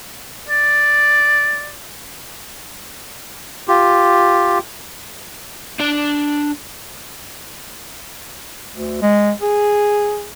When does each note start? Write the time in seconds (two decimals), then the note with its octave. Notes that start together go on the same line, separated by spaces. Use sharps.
0.48 D5
3.68 F4 G4
5.80 D4 D5
8.73 D2
9.02 G#3
9.42 G#4